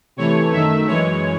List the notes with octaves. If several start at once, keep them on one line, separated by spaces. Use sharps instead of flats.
C3 E3 A3 C#5
F#2 D#3 A3 E5
F#2 E3 G#3 C#5